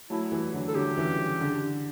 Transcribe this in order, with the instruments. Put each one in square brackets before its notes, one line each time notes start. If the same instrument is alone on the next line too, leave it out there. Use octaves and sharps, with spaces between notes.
[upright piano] F#3 A3 [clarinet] E4
[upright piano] E3 G3
D3 F#3
[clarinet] A4
[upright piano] D3 F#3 [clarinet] G4
[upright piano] C#3 E3
C#3
D3